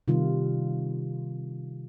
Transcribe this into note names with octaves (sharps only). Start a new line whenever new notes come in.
C3 D#3 G3 F4